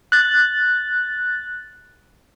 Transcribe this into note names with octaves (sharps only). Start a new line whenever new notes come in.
F#6 A6